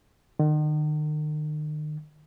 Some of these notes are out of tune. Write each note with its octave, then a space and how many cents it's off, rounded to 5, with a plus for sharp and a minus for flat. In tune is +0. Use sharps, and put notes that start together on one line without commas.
D#3 -40